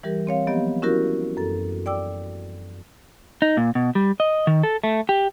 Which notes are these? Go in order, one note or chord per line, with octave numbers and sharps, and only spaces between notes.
E3 G3 G4 A#4
C4 C#5 F5
F3 F#3 A#3 B3 G4 D#5
C#4 E4 F#4 G4 A#4
F#2 A4
D5 G5 D6 E6
D#4
A#2
B2
G3
D#5
D#3
A4
A3
G4